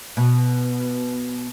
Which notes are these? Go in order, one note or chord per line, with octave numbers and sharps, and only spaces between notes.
B2